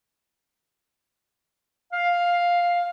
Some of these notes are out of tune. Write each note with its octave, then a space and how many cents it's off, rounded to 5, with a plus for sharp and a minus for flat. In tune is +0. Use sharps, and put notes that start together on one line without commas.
F5 +5